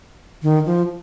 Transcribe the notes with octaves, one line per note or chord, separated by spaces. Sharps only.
D#3
F3